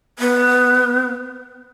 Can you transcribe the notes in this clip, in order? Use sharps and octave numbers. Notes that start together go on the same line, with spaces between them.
B3